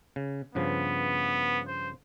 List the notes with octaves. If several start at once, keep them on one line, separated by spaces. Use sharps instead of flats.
C#3
G2 C#3 F3 B3
C5